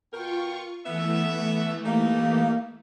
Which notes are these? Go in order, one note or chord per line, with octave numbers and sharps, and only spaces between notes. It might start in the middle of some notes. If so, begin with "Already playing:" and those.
B2 F4 A#4 G5 C#6
E3 A3 B3 E5
A#3 D#4 G4